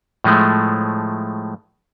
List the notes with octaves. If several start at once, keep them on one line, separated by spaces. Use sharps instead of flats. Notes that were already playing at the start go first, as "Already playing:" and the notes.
A2 F3 G#3 A3